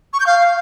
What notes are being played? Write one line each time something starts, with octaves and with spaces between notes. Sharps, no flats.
C#6
G6
F5